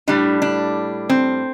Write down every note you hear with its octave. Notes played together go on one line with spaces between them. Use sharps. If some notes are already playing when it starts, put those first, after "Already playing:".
A2 G3 D4
D4
C4